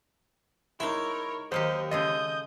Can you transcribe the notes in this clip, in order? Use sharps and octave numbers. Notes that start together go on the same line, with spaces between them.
G#3 D#4 E4 A#4 C#5
D#2 F#3 A#3 G4 C5 D#5
C#3 G#3 A4 D#5 D#6 G6